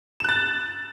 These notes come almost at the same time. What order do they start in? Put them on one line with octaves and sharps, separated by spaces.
E7 F#6 A6